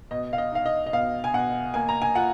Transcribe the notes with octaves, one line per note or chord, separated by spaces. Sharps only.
B2 D#5
F5
D#5
D#4 F5
D#5
D#5
B2 F5
G#5
B2 F#5
A#3 G#5
A#5
G#5
F4 F#5